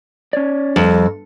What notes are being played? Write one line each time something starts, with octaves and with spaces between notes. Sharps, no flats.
C#4 C#5 D5
F2 G3